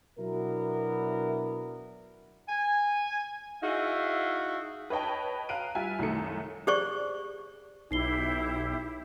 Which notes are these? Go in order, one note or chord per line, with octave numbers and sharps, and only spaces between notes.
B2 F#3 B3 D4 E4 A#4
G#5
D#4 E4 F#4 G#4 E5 F5
B4 C#5 D#5 G5 A5
F5 A#5 F#6 D7 D#7
G3 F4 E5 G#5
C2 F#2 D#3 A3 C#7
G4 G#4 C5 D5 C#6
B1 D#4 E4 G4 C7 G7